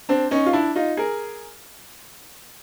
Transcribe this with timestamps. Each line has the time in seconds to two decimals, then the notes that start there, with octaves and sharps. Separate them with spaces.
0.09 C4 D4
0.31 C#4 D#4
0.46 F4
0.53 D4 E4
0.76 D#4 F4
0.97 G#4 A#4